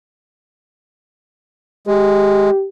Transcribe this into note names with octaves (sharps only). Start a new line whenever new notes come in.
G#3 G4